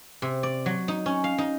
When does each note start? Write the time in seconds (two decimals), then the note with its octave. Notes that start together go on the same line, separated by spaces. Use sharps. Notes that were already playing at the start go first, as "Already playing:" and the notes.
0.22 C3
0.43 D5
0.66 F#3
0.88 D#4
1.06 C#4
1.24 F5
1.38 D#4